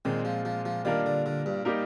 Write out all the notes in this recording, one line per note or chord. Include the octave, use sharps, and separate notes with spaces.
A#2 D#3 G#3 C4
F3
F3
F3
D#3 G3 A#3 D4 F4 A#4
D3
D3
G2
G3 A#3 D#4 G4 A#4